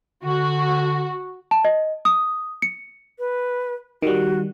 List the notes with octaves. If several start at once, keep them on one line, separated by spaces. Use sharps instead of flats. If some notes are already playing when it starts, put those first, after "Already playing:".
D3 F#4
A5
D#5
D#6
C#7
B4
D#3 G3 F#4